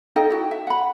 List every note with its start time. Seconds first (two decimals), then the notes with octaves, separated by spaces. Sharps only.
0.16 D#4 A4 D#5 G5
0.30 E4 F#4 A5
0.51 E5
0.67 F#5 B5